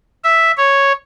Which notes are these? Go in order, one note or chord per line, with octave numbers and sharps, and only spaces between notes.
E5
C#5